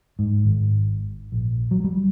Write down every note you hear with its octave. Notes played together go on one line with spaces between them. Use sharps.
G#2
G#1
A#1
F#3
G3